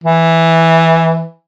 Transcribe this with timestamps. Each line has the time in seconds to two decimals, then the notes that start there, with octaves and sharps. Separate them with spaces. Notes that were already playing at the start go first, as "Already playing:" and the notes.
0.04 E3